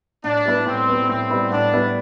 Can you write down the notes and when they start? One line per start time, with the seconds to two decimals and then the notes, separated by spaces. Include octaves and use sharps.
0.24 A2 D4
0.45 G3 B3 E4 B4
0.66 A2 C4
0.88 G3 B3 E4 B4
1.09 A2 C4
1.30 G3 B3 E4 B4
1.51 A2 D4
1.73 G3 B3 E4 B4